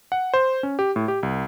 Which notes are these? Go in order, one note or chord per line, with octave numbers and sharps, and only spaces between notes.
F#5
C5
C#4
G4
A2
G4
C2